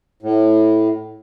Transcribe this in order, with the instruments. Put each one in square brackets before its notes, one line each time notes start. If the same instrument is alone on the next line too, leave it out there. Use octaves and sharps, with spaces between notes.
[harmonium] A2